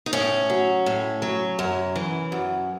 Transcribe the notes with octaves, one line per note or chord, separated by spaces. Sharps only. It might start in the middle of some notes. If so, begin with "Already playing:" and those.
D#4
A2 C#4
F#3
A2
F#3
F#2
E3
F#2